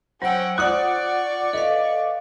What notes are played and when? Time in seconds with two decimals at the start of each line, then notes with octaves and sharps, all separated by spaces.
0.22 F#3 C#4 C5 F#5 G5 E6
0.58 F4 C5 D5 F#5 C#6 D#6 F#6
1.53 A4 B4 D#5 F5